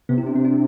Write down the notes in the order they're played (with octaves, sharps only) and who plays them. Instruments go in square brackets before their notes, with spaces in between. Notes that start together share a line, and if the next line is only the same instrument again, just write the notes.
[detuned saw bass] C3 [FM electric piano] B3
[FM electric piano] E4
D4
C4
D4